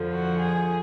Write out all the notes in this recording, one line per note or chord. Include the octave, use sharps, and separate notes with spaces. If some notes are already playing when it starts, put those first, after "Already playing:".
Already playing: F2 D3 F3
F#4
G#4